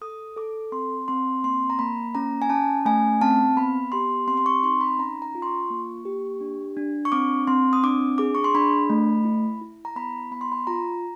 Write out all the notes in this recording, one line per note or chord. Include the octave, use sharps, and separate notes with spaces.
A4 D#6
A4 D6
C4 C6
C4 C6
A#3 C6
A#5
A#3 B5
C#4 A#5
G#5
C#4 A5
A3 G#5
C4 A5
B3 B5
G4 C6
C4 C6
C6
C#6
D#4 C6
B5
C#4 A#5
A#5
F4
C6
C#6
A#3
G4
D4
D4
C#6
C4 D6
C4 C6
D#6
D4 D6
G#4 D6
C#6
C6
D4 B5
A3
E4
E4
A#5
B3 B5
B3 B5
C6
B5
F4 A#5